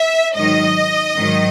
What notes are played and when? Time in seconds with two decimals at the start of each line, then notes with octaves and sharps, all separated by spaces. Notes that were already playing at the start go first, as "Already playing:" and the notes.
Already playing: E5
0.35 G#2 D#3 F#3 D#5
1.16 G#2 D#3 F#3